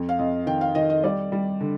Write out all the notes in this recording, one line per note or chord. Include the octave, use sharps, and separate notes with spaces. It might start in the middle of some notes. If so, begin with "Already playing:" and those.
Already playing: F2
F5
F2 D#5
D#3 G5
F5
D#3 D#5
D#5
G3 D5
G3
D3